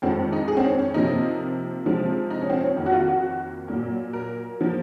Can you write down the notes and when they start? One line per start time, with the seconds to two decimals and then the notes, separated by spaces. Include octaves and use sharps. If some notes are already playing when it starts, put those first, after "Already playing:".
0.02 F2 D#3 G#3 C4
0.33 D#4
0.48 G#4
0.57 C4
0.63 C#4
0.79 C#4
0.94 C3 F3 A#3 D#4
1.86 C3 F3 G#3
2.30 D#4
2.41 C#4
2.50 C4
2.60 C#4
2.76 F2 D#3 A#3
2.86 F#4
2.92 F4
3.08 F#4
3.68 A#2 F#3 A#3
4.13 A#4
4.61 F3 A#3